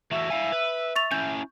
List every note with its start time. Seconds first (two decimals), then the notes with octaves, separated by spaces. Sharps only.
0.11 E3 A3 F#4 E5
0.30 E4 F5 G#5
0.52 B4
0.96 C#6 A6 F7
1.12 C#4 E4 G6